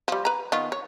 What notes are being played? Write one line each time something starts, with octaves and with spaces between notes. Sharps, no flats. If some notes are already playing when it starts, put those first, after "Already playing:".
F3 G3
B4 A#5
D#3 B3 F4
C#5